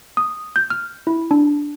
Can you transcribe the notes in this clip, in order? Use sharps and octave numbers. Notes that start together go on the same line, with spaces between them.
D#6
G6
F6
E4
D4